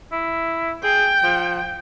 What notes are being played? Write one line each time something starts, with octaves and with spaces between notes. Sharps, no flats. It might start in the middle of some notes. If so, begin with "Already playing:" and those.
E4
G#4 G5
F3